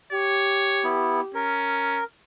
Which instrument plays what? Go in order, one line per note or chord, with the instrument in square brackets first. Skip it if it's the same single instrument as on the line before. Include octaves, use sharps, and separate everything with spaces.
[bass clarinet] G4 [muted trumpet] C#5
[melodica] B3 E4
[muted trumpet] C#4 [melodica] A#4